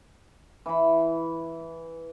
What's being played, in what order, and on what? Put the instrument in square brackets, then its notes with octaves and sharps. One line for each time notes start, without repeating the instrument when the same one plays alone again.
[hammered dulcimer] E3 B5